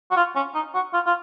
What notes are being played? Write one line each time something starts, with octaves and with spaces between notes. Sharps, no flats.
F#4
F4
C#4
D#4
F#4
F4
F4